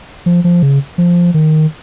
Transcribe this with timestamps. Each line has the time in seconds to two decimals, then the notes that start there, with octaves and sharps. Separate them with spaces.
0.26 F3
0.44 F3
0.63 C#3
0.98 F3
1.34 D#3